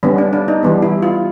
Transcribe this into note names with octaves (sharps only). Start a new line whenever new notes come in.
D3 G3 B3 C#4
D4
D4
D#4
E3 G3 B3
E4
F4